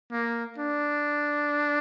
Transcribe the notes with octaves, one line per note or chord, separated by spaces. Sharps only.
A#3
D4